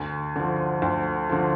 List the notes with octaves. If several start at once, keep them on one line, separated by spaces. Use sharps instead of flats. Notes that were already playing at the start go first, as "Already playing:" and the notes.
Already playing: D2
D3 F3
D2
D3 F3